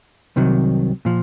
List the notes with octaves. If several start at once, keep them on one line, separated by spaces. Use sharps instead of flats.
C2 C3 D#3 F#3
A#2 F3